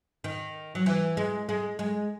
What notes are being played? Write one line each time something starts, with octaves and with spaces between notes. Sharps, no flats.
D#3
F#3
E3
G#3
G#3
G#3